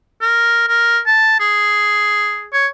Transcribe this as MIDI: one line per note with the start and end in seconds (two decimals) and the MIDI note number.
0.22 0.65 70
0.68 0.99 70
1.06 1.40 81
1.40 2.46 68
2.53 2.67 73